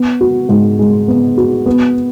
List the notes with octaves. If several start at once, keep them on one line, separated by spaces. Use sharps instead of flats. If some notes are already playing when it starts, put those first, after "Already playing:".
Already playing: B3
F#4
G#2
G#3
B3
F#4
B3